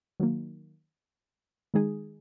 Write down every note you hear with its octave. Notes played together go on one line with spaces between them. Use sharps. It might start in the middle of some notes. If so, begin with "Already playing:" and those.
D#3 F#3 A#3
D#3 G#3 D#4 G#4